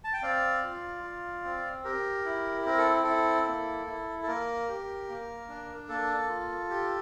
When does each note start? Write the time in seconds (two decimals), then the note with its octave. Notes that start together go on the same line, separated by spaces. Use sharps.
0.04 A5
0.13 G5
0.22 C4 D5 F5
0.63 F4
1.04 F4
1.44 C4
1.84 G4 A#4
2.25 E4
2.66 C4 A#4
2.78 A4
3.03 E4 A4
3.46 A#3
3.87 E4
4.23 A4
4.27 A#3 A#4
4.68 G4
5.08 A#3
5.49 D4
5.89 A#3 A4
6.29 F4
6.70 G4